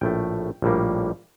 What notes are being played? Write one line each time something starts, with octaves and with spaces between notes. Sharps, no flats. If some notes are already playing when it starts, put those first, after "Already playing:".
A#1 A2 A3 G5
A#1 A2 G3 A#3